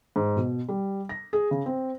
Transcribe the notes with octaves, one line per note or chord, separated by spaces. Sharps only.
G#2
B2
G3
A#6
G#4
C#3
C4